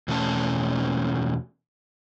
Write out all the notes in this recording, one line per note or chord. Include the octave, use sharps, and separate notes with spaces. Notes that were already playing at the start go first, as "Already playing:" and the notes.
E2 B2 A3 C#4 A5